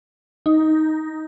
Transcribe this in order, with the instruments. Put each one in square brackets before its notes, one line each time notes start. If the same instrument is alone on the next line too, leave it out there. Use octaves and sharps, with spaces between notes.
[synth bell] D#4